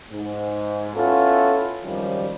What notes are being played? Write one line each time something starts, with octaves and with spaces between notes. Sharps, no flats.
G#2
B3 C#4 E4 F4 A4
G#1 F#2 D#3 F3 G3